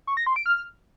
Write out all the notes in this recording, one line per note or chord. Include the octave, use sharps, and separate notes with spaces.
C#6
A#6
C6
D7
F6